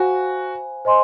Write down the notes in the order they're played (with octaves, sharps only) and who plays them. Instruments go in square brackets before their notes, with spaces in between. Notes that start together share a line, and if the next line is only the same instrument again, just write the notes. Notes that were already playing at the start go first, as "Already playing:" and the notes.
Already playing: [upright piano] F#4 [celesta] C5 F5 G#5 B5
[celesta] C5 D#5 G#5 C6